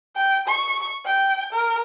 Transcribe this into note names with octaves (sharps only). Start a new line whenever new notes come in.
G5
C#6
G5
A#4